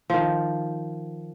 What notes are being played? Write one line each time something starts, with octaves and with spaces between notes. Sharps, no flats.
D#3 F3